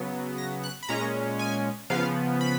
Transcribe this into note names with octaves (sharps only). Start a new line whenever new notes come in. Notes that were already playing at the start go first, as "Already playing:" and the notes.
Already playing: C#3 F#3 B3
A#6
F#6
B5
A#2 G#3 C#4 A#5
G#5
C#3 F3 B3 F5
B5